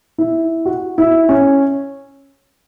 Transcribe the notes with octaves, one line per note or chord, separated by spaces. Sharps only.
E4
F#4
E4
C#4